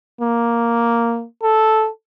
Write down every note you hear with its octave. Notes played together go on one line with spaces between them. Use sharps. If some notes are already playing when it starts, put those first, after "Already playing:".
A#3
A4